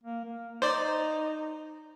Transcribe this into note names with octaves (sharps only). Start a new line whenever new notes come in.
A#3
A#3
D#4 C5 D5